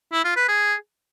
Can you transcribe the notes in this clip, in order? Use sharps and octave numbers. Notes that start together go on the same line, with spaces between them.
E4
F4
B4
G#4